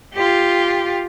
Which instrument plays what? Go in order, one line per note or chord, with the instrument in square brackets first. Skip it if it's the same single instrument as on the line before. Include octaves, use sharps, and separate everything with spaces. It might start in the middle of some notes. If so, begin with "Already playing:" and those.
[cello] F4 G4